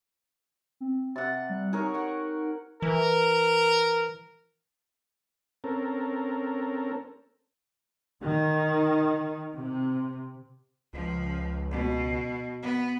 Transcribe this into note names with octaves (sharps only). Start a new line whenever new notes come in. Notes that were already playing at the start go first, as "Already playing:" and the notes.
C4
C3 F#5 A6
G3
D#4 G#4 A#4 C#5
F#5 G5 C#6
E3 A#4
C4 C#4 A4 A#4
D#3
C3
C#2 F3
B2
B3